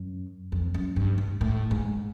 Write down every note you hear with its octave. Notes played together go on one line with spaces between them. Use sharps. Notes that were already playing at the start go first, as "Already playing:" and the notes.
Already playing: F#2
F2
F#2
G2
G#2
A2
G#2